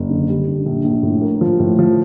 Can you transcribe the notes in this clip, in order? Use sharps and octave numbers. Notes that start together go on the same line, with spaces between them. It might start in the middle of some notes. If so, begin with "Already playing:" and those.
Already playing: F#1
D3
G3
D3
A#1
A#1
A2
A#3
F3
A2
F3